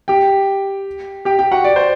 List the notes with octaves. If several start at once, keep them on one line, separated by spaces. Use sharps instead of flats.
G4 G5
G4 G5
G4 G5
F#4 F#5
D5
C5